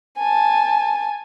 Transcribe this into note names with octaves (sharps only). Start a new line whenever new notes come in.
G#5 A5